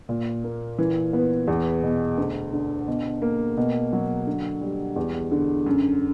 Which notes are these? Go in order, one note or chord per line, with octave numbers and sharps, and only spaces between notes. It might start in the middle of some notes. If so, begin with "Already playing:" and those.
A#2
A#3
E3
B3
E2
B2
D2
D3
B2
A#3
B2
F#3
D3
G3
E2
D3
F#2